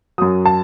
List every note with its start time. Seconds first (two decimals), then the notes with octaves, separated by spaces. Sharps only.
0.18 F#2 F#3 D#6
0.45 A5